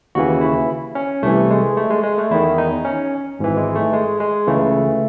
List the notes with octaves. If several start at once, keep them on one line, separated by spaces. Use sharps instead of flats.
D#2 C#3 E3 F#4
E4
C#4
C2 C3 E3 A3
G#3
A3
G#3
G#3
A3
E2 D#3 E4
D#4
C#4
G#1 G#2 E3
G#3
A3
G#3
G#3
C#2 C#3 E3 A3